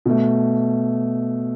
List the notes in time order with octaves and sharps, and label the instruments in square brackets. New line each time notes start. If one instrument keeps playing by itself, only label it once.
[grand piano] B2 A3